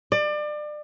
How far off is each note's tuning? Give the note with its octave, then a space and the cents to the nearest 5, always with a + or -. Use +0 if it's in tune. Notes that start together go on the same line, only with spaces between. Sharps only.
D5 +30